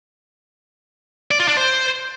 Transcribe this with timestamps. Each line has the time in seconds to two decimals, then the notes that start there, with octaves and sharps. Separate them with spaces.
1.31 D5
1.40 F4
1.48 D4
1.57 C5